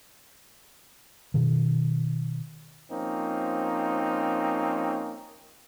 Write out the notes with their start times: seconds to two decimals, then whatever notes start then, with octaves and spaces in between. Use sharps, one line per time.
1.34 B2 D#3
2.91 F3 A#3 C4 C#4 D#4